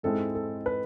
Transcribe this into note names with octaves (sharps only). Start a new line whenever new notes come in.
G#2 G#3 C4 E4 A4
A4
B4